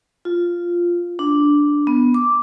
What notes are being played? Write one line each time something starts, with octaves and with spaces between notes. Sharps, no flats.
F4
D4
B3
D6